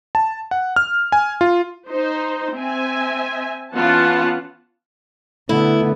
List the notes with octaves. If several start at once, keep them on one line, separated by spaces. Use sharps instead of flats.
A5
F#5
F6
G#5
F4
D#4 C5
C4 E5 G#5
E3 B3 C#4 F4 F#5 A5
D3 A3 B3 E4